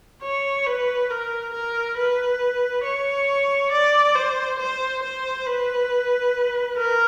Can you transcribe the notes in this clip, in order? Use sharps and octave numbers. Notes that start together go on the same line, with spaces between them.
C#5
B4
A#4
A#4
B4
C#5
D5
C5
C5
C5
B4
A#4